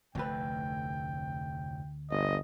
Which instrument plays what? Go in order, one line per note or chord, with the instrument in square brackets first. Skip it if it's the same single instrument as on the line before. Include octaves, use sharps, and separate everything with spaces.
[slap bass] F1 A2 A3 [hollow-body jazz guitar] D2 B4 [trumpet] G5
[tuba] G1 [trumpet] D#5